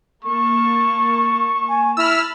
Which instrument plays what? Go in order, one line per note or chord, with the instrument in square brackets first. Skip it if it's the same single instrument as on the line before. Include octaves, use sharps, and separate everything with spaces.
[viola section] A#3 A5 [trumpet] C#6
[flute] G#5
[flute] E4 [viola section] A5 B5 [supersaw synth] E6 F6